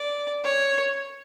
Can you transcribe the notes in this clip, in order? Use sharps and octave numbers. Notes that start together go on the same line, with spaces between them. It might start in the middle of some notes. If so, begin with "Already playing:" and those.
Already playing: D5
C#5